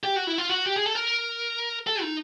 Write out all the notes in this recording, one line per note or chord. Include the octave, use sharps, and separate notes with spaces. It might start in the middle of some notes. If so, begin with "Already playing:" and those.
G4
F#4
E4
F4
F#4
G4
G#4
A4
A#4
A4
D#4